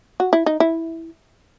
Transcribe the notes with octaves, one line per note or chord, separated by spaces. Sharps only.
F#4
E4
D#4
E4